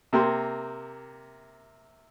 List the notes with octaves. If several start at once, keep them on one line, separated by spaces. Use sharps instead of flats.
C3 A#3 G5 C6